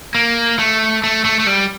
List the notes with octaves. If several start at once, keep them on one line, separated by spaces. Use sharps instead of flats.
A#3
A3
A3
A3
A3
G3